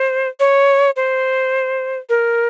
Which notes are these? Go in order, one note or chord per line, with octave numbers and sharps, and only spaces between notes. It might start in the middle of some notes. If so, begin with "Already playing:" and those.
Already playing: C5
C#5
C5
A#4